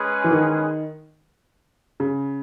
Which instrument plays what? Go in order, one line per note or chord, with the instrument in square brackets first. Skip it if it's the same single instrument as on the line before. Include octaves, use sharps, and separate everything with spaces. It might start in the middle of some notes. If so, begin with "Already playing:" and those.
Already playing: [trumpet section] G#3 C#4 G#4 B4
[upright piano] E3
D#3
C#3